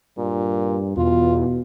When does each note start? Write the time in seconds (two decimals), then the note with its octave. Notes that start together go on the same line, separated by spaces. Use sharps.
0.18 G2 A#2
0.97 E2 B2 F4